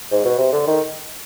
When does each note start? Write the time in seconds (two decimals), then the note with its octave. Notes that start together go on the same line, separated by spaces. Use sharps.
0.11 G#2
0.25 B2
0.38 C3
0.52 D3
0.67 D#3